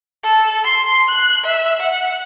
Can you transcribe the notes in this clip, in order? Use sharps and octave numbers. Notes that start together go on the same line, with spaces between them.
A4
C6
F#6
E5
F#5